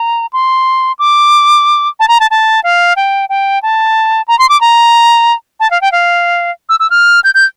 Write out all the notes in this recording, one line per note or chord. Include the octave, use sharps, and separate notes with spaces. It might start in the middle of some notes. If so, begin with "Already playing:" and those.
Already playing: A#5
C6
D6
A5
A#5
A5
A5
F5
G5
G5
A5
A#5
C6
D6
A#5
A5
F5
G5
F5
E6
E6
F6
G6
G6